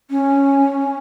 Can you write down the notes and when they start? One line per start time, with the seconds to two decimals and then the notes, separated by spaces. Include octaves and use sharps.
0.10 C#4